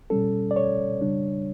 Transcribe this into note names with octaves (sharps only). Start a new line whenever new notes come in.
B2 G3 C#4 A4
D5
C#5
C#3 G3 D4